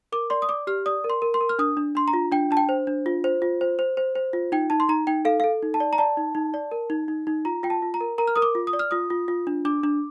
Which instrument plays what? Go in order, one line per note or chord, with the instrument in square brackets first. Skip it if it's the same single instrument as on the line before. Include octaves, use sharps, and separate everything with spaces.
[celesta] A#4 D6
D5 C6
D#6
D5 D6
G4 F6
D5 D#6
A#4
C6
A#4
C6
A#4
F6
D4 D#6
D4
D4 C6
A#5
F4
D4 G5
D4 A5
G5
C5
D4
F4
C5
F4
C5
C5
C5
C5
F4
D#4 G5
D#4 A5
C6
D#4 A#5
D#4 G5
A4 F5
F5
A4
D#4
A5
D5
A#5
D5 A5
D#4
D#4
D5
A#4
D#4
D#4
D#4
F4 A#5
F4 G5
A5
F4
A#5
A#4
A#4 A#5
F6
A#4 D#6
D6
F4
D#6
D5
F6
F4 D#6
F4
F4
D4
D4 D6
D4